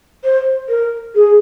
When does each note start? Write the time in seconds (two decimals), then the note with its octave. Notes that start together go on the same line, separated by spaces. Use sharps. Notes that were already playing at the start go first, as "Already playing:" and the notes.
0.24 C5
0.68 A#4
1.15 G#4